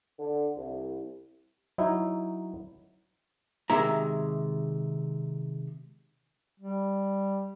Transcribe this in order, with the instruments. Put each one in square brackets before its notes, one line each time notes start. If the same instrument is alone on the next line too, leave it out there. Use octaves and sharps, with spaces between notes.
[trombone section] D3
C2
[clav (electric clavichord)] F#3 D#4 E4
[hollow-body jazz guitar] C3 D#3 G#3 E5 A#5
[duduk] G3